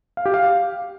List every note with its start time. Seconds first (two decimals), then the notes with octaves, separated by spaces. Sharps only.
0.17 F5
0.26 G4
0.34 F5